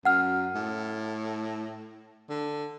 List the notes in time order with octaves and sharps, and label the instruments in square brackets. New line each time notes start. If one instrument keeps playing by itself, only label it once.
[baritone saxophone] F#2 [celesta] F#5 F6
[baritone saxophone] A2
D3